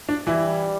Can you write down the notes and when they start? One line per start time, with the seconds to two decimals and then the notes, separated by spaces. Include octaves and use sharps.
0.09 D4
0.27 E3 G3 E4